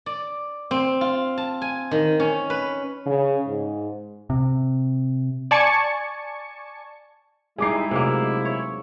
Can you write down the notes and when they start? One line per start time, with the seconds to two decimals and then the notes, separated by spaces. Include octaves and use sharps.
0.06 D5
0.71 C4
1.01 F4
1.37 A5
1.62 G#5
1.91 D#3
2.20 C#4
2.50 B4
3.06 C#3
3.47 G#2
4.30 C3
5.51 D5 G#5 A5 C#6 G#6 C#7
7.58 G3 G#3 D#4 E4 G#4 D6 C7
7.91 C3 F#3 A3 A#3 D6
8.45 C#5